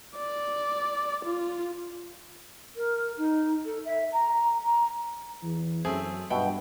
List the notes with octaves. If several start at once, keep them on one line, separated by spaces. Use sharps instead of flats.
D5
F4
A#4
D#4
A4
E5
A#5
A#5
E2 E3
F#2 A3 C4 G#4
G2 B2 E5 F#5 G5